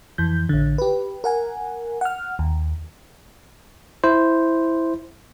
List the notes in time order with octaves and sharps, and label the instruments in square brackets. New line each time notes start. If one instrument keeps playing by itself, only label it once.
[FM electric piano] F2 E3 G6
A1 D3
G4 B4
A#4 F#5 G#5
F#5 F6
D#2
[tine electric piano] E4 C5